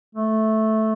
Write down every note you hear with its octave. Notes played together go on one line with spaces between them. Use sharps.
A3